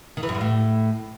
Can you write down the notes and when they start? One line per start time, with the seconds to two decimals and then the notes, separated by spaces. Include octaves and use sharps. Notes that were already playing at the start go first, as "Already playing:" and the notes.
0.17 D#3
0.23 E3
0.29 F#2
0.35 G2
0.41 A2